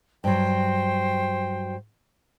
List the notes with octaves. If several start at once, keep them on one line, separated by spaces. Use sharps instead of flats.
G2 F#3 C5 G5